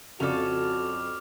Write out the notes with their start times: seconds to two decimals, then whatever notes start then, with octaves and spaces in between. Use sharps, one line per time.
0.20 F2 C#3 F#4 A4 D5 D6 F6 F7